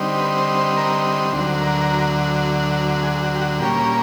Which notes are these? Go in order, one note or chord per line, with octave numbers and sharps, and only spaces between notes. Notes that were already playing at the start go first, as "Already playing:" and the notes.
Already playing: D3 G3 C4 D#4
B4
C5
C5
A#4
D2 D3 F#3 C5
A#4
G#4
F#4
G4
F#4
A#2 G3 A#3 C#4 G4